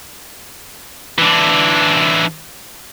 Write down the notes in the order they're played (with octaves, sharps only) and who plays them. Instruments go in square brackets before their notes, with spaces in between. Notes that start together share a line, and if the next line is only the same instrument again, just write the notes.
[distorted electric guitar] E3 D4